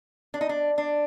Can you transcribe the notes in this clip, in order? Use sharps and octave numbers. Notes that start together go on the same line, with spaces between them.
D4
D#4
D4
D4